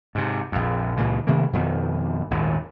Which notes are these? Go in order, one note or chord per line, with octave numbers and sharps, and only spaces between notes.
G#2 C3
A#1 F2
C#2 A#2 C#3 E3
C3 D#3 A3 A#3
F2 B2 D#3
G#1 D#2 A#2